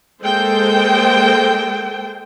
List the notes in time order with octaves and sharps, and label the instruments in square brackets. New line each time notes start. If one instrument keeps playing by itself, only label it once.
[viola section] G#3 A#3 A4 C5 G5